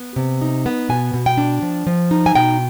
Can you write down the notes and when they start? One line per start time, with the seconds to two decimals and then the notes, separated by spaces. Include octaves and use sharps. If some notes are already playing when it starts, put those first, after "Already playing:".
Already playing: B3
0.16 C3
0.41 D#4
0.66 B3
0.89 B2 G#5
1.14 B2
1.26 G5
1.37 D4
1.62 F3
1.87 F3
2.11 D#4
2.26 G#5
2.35 B2 G5